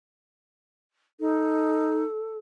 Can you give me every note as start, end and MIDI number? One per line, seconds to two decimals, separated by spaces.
1.20 2.03 63
1.20 2.37 69